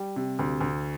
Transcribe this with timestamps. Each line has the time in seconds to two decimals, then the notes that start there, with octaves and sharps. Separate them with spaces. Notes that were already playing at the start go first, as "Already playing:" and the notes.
Already playing: G3
0.16 C3
0.39 D2
0.61 D2